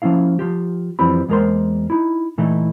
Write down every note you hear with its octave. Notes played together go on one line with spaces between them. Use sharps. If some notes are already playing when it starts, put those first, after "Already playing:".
F3 A#3 C#4 E4 F5
F3 F4 G4
F2 E3 F3 G3 C4 B5
E2 G#3 A#3 A#4 C5 C6
D#4 E4
A#2 E3 A3 D#4 E4